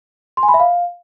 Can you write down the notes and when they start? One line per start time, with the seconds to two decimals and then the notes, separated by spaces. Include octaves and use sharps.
0.37 C6
0.43 G#5
0.48 B5
0.54 E5
0.60 F5